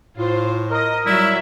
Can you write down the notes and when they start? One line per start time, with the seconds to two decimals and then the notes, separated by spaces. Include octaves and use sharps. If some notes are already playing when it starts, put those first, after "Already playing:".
0.16 A2 F4 C5
0.71 A#4 D#5
1.06 F#3 G3 E4 E5